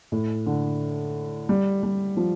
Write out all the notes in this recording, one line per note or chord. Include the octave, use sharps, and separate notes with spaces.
A2
D3
G3
G3
F3